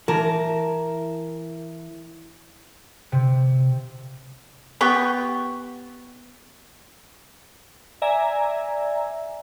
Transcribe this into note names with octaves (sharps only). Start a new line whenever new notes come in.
E3 A#4 A5
C3
B3 G4 G5 C#6
D5 E5 G#5 A#5